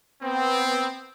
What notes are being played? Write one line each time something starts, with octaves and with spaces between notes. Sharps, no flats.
B3 C4